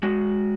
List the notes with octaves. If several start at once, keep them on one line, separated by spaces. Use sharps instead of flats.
G#3 F#4